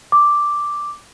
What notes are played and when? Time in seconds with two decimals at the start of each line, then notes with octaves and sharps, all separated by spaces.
0.12 D6